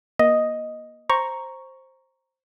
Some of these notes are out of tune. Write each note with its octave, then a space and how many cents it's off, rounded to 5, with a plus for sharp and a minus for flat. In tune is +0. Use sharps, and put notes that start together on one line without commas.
A#3 +30 D#5 +0
C5 +10 A#5 +0 C#6 +0